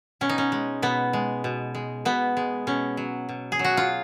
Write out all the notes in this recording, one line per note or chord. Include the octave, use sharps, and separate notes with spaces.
B2 C#4
D#4
C#4
G#3
B2 B3
G#3
B2
G#3
B2 B3
G#3
B2 C#4
F#3
B2
G#4
F#3
F#4
F4